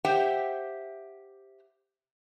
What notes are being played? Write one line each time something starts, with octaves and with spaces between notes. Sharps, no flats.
G4 C5 E5 F#5 G5